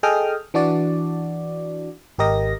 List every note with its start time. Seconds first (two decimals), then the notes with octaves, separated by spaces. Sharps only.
0.03 G#4 A4 D#5 G5 D#6 F6
0.54 E3 D4 F#4 D5
2.19 G#1 G4 A#4 D#5 A#6